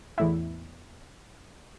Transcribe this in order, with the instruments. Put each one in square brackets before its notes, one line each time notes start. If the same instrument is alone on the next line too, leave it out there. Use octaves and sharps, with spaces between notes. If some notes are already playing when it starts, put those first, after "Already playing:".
[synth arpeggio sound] E2 A2 E4